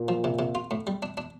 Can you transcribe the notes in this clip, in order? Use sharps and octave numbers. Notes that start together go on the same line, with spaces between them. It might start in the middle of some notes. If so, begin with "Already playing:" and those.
Already playing: A#2
F3
C3
C3
F4
A2
G3
D4
D4